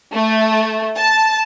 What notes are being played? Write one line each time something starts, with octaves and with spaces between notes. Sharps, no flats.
A3
A5